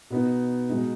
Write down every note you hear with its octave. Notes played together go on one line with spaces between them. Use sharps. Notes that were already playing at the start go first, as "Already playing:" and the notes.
B2 B3 D#4
B2 G#3 D#4